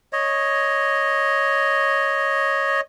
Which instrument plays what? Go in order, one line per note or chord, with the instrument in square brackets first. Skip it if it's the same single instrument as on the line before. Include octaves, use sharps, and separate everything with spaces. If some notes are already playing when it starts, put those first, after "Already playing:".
[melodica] C#5 D#5